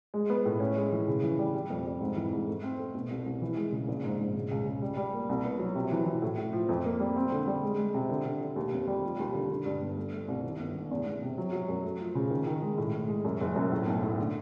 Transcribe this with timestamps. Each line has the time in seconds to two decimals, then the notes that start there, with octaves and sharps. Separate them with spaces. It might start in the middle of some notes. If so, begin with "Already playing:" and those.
0.14 G#3
0.30 B3
0.45 A2
0.60 C#4
0.76 G#3
0.92 E3
1.08 C#3
1.23 E3
1.39 G3
1.54 G3
1.70 F2
1.86 G3
2.01 G#2
2.16 E3
2.32 G#2
2.47 A3
2.64 C4
2.79 A3
2.95 B2
3.10 C2
3.26 C2
3.42 E3
3.57 G#3
3.72 C#3
3.88 A#1
4.04 G#2
4.19 G#2
4.35 C#3
4.51 C#2
4.66 C#3
4.82 G3
4.97 G3
5.13 A#3
5.29 C2
5.44 B3
5.59 F#3
5.75 C3
5.92 E3
6.06 E3
6.22 A2
6.38 A2
6.53 F3
6.69 F2
6.85 A#3
7.00 G3
7.16 C4
7.32 D3
7.47 G3
7.63 G#3
7.78 G#3
7.94 C3
8.09 D3
8.25 D3
8.41 D3
8.56 D#2
8.72 F1
8.87 G3
9.03 F3
9.19 D#2
9.34 D3
9.50 D3
9.66 G2
9.81 G1
9.97 A3
10.12 A3
10.28 C2
10.43 D#3
10.60 G1
10.75 G1
10.91 E2
11.06 E2
11.22 C3
11.38 F#3
11.53 F#3
11.68 F#2
11.84 A3
12.00 F3
12.15 C#3
12.30 D#3
12.47 D#3
12.62 G#3
12.78 A2
12.93 A2
13.08 G#3
13.25 F#2
13.41 F#1
13.56 F#2
13.72 A2
13.87 B1
14.02 A2
14.19 D3